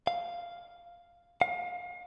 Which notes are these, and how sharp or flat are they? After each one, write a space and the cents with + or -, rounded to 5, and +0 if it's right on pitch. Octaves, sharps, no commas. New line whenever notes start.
F5 -5
F5 +35